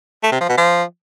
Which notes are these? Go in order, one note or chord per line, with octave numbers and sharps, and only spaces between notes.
A3
C3
F3
B2
F3